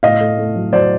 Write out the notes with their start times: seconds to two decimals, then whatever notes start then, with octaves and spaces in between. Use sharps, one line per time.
0.03 A2 D#5 F5
0.21 A3
0.38 A3
0.56 F#3
0.73 F#3 C5 D5